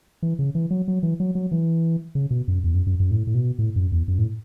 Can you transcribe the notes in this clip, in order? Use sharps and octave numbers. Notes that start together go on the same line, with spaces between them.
E3
C#3
E3
F#3
F#3
E3
F#3
F#3
E3
C#3
B2
F#2
E2
F#2
F#2
F#2
A2
A2
B2
A2
F#2
E2
F#2
A2